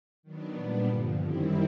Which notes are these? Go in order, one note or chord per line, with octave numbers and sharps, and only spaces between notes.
D#3 F#3 B3 D4
A#2 G3 B3 D4
G2 D3 F3
F#2 D#3 G3 C4 E4